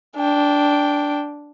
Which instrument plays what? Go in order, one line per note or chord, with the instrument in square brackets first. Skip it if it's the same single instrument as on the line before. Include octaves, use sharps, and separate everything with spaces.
[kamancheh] D4 G5